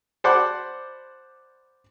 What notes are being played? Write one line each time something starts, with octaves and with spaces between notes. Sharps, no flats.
C5 D5 F#5 A5 B5 D6